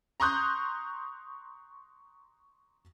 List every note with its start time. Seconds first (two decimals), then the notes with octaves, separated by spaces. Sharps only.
0.20 A#5 C6 C#6 D#6 F#6 G6